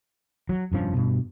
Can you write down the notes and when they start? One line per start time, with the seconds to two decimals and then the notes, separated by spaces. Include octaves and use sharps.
0.49 F#3
0.72 F1 G2 F3 C#4
0.94 G2 B2